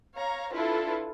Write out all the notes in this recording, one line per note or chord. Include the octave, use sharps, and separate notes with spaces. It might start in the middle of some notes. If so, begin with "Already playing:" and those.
C#5 F5 A#5
D4 E4 F4 A4 B4